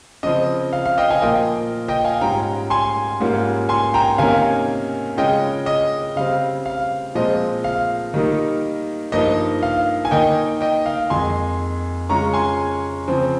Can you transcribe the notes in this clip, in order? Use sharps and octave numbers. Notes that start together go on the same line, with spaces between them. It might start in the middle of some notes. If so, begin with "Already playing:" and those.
C#3 F3 C4 D#5
F5
F5
D#5 G5
F5 G#5
A#2 F3 A#3 F4 D#5 G5
D#5 G5
F5 G#5
G#2 G3 C#4 F4 G5 A#5
G#5 C6
G#2 G3 A#3 C#4 F4
G#5 C6
G5 A#5
C3 D#3 A#3 C#4 F5 G#5
C#3 G#3 C#4 F4 D#5 G5
D#5
C#3 G3 C4 F5
F5
A#2 F3 G#3 C4 F4 D#5
F5
D#3 G3 A#3 D#4
G2 F3 A#3 D#4 D#5
F5
G#5
D#3 A#3 D#4 D#5 G5
D#5 G5
F5
F2 D#3 G#3 G#5 C6
C#3 G#3 C#4 F4 A#5 C#6
G#5 C6
C#3 F3 C4